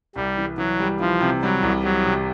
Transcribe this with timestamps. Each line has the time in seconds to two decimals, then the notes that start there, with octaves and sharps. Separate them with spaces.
0.16 C2 G3
0.37 E3
0.58 E3 F#3
0.80 G3
1.00 E3 F3
1.21 C3
1.43 F#3 G3
1.63 C2
1.84 F#3 G3
2.05 C3